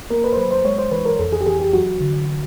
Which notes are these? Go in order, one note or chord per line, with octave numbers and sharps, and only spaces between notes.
A#3 A#4
B4
C5
F#3 B4
C5
G#3 C#5
C5
E3 B4
A#4
F2 A4
G#4
G4
E3 G#4
G4
F#3 F#4
D3